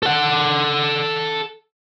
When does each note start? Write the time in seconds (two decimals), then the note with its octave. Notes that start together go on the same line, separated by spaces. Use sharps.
0.03 A4 F#5